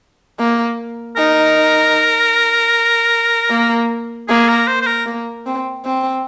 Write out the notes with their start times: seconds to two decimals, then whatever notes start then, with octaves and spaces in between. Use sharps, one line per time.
0.39 A#3
1.16 D#4 A#4
3.51 A#3
4.29 A#3 G#4
4.49 A#4
4.68 C5
4.81 C5
4.87 A#4
5.06 A#3
5.46 C4
5.85 C4